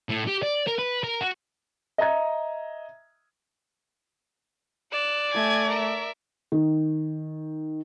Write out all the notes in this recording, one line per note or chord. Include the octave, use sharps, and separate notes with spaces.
A2
G4
D5
A#4
B4
A#4
F#4
D#5 E5 A#5 G#6
D5 F#6 E7
A3 G#5 G#6
A#4 E5
D#3